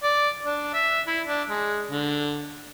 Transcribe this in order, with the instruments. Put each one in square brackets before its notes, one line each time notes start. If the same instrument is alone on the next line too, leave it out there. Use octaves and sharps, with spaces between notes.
[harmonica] D5
D4
E5
E4
D4
G#3
D3